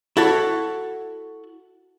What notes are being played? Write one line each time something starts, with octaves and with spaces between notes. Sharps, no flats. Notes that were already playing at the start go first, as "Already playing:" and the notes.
E4 F#4 A4 C#5